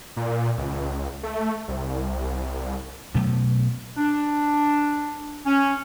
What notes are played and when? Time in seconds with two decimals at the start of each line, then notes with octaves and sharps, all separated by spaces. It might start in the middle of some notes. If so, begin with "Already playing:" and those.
0.17 A#2
0.58 C#2
1.23 A3
1.68 C2
3.15 B2 F#3 A3 B3
3.97 D4
5.46 C#4